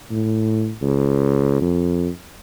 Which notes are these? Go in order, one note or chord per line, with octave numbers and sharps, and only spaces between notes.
A2
C#2
F2